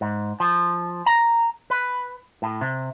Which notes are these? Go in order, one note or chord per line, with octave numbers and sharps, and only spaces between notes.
G#2
F3
A#5
B4
A2
C3